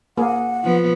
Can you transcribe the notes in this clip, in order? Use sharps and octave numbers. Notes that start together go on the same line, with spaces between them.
A#3 G#4 F#5
F3 B3